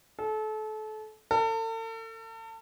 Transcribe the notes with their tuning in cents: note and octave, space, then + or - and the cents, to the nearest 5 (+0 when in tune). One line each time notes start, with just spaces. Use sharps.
A4 -30
A4 +40